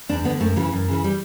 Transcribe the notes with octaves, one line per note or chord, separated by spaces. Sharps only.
E2 D4
D3 B3
F#2 A3
C#3 E3 F#3
F#2
C#3 E3
G3